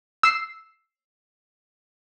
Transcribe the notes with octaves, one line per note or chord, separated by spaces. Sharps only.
E6 C7